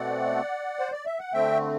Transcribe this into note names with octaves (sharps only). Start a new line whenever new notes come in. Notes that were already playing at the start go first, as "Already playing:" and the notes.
Already playing: B2 A3 C4 D5 F#5
C5
D5
E5
F#5
D3 A3 C4 E5 G5